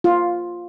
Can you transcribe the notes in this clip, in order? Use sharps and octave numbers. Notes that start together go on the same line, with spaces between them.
F4